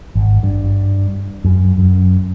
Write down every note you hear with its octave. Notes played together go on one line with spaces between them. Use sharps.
G#1
G2
F#2
F#2